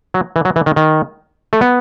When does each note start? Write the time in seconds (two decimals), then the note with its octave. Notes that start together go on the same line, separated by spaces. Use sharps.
0.14 F#3
0.36 E3
0.45 F#3
0.56 E3
0.66 D#3
0.76 D#3
1.53 A3
1.61 B3